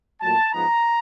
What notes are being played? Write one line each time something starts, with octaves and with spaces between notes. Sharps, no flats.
A#2 F#3 A3 A5
G#2 F3 G#3 B3 D#4 A#5